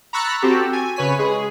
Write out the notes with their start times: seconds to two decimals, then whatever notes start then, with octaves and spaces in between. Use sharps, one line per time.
0.13 A#5 B5 C#6 E6 F#6 A6
0.42 C4 F#4 G4 A4
0.73 G#5
0.96 C#3 B4 C#5 G#5 B6
1.19 G#3 G#4